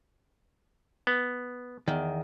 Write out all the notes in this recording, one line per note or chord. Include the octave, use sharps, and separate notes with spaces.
B3
E2 D#3